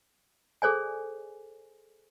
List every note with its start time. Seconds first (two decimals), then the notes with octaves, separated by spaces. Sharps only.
0.62 G#4 A4 C5 D5 G#5